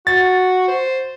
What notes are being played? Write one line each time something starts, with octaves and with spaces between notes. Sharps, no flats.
F#4 A6
C5